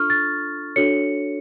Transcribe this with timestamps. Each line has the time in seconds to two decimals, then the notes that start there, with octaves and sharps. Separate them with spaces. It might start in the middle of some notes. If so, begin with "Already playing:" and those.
Already playing: D4 F4 A4 C#6 F6
0.10 A6
0.76 D4 F#4 A4 C#5 C#7